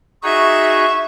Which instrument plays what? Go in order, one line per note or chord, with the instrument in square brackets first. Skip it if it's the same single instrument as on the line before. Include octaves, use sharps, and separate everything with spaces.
[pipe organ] D#4 F#4 G#4 [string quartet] E5 [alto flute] C#6